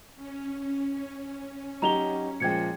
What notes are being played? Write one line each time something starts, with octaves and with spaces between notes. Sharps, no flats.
C#4
F#3 D#4 G4 A#5 F7 G7
A#2 F3 G#3 G5 G#6 C#7